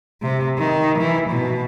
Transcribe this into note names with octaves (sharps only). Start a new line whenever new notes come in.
C3
D#3
E3
B2